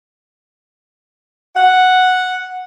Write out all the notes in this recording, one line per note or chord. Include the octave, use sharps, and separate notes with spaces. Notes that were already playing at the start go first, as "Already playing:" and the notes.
F#5